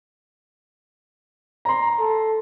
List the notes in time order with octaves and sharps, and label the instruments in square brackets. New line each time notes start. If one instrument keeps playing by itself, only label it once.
[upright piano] A#5 C6
[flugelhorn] A4